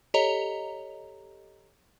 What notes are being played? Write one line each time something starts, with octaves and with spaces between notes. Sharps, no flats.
G4 A4 C#5 D#5 A#5 F7